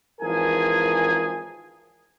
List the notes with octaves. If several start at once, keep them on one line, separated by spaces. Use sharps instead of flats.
G#1 E3 F3 G#4 A#4 G#5